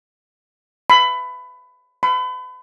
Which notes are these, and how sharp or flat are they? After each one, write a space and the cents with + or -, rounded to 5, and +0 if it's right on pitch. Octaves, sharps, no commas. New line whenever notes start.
B5 +20
B5 +35